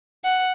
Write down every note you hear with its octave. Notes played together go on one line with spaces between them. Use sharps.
F#5